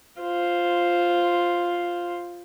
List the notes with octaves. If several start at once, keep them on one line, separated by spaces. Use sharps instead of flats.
F4 C5